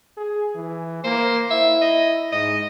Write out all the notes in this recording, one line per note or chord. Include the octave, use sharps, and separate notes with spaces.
G#4
E3
A#3 C5
E4 E5
D#5
G#2 D#5